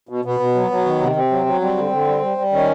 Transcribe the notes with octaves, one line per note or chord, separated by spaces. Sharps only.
B2
B2 B3
B2
F#3
F#3
D#3
C3
C3 C4
F#3
F#3
G3 C4
D3
D3
G3
G3
G3
D#3 C#4